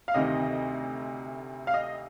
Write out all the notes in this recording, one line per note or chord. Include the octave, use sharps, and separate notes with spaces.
F5
D2 C3 D#3 D#5
F5
D#5